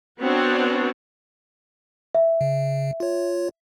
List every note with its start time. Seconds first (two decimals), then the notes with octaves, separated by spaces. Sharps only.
0.21 B3 C4 D4 F#4 C#5
2.15 E5
2.41 C#3
3.00 F4 C#5